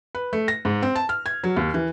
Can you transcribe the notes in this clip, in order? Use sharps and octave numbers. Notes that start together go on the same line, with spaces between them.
B4
A3
A#6
G#2
C4
A5
F6
G#6
F#3
D#2
E3